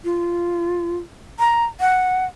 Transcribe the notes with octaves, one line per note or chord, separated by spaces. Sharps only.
F4
A#5
F#5